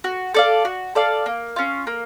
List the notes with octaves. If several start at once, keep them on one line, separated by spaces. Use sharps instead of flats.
F#4
A4 D5 F5
F#4
A4 D5 F5
A#3
C#4 F4
A#3